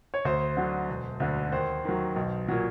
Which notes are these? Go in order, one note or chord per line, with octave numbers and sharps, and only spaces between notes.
C#5
D2 C5
D3 F#3
E1
D2 D3
D#2 C5
D#3 F#3
B1
A#2 F#3